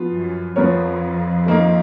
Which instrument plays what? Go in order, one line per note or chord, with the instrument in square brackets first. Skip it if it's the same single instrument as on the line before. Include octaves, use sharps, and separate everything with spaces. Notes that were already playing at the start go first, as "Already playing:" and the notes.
Already playing: [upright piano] F3 B3 F4
[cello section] F#2
[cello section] F2 [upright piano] F3 B3 F4 A#4 C#5
[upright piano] D#3 A#3 D#4 A#4